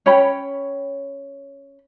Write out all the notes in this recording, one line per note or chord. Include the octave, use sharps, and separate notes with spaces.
C#4 C#5 G5 B5